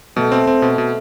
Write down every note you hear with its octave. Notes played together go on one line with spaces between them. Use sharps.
B2 A3
C4
C4
B2
B2